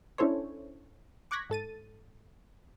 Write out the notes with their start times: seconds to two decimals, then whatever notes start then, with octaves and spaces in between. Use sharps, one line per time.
0.18 C#4 D4 E4 A4 C5 C#5
1.31 C#6 D6 F#6 G#6 A#6 B6
1.50 G#2 A4 A6 D#7